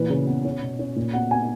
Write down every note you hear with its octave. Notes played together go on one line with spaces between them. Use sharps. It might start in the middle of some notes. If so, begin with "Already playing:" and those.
Already playing: A#2 E3 B4
C#3
B3
C#4
B2
C#4
A#2
B3 F#5
B3 G#5